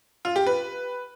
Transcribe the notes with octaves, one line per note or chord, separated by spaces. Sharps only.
F4
G4
B4